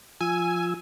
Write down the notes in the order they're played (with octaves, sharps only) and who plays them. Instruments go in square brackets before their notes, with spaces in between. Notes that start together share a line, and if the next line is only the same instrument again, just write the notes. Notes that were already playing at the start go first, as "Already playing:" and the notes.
[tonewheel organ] F3 F4 E6 [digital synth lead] G#5